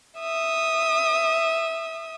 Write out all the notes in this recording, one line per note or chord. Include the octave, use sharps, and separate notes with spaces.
E5 D#6